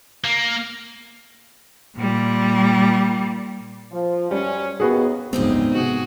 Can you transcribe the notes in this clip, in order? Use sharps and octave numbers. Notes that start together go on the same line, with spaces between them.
A#3
A#2 G3
F3
F#2 G3 C#4
D#2 B3 F#4 G#4
F#1 D2 G#2 F3 B3 C4 D#4 G4
G#2 C3 F#4 G#4